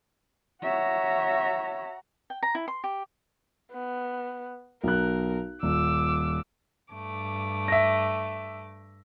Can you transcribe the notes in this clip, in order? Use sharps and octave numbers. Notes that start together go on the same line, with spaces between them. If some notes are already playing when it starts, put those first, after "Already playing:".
F#4 C#5 E5 A#5
G5
A#5
E4
C6
G4
B3
B1 A#4 F#6
D#1 D6 E6
G2 A3 D6
E5 A#6